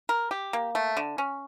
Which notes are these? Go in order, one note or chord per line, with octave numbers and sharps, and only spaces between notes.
A#4
G4
A#3
A3
D3
C#4